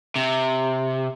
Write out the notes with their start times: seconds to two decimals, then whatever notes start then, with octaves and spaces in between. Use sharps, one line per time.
0.16 C3